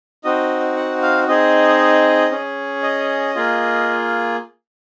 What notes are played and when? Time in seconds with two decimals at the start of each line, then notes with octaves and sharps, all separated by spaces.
0.24 C4 D#4 F#4 D#5
0.76 F#5
1.02 F5
1.28 C4 D#4 G#4 D#5
2.31 C#4 G#4
2.83 D#5
3.35 A#3 F4 G#4